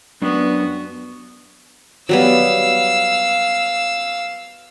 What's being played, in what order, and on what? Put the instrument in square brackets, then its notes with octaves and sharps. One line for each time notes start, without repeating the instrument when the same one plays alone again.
[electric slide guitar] F#2 D4 [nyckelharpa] B3 F#4
[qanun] F#3 G3 B3 [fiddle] F5 E6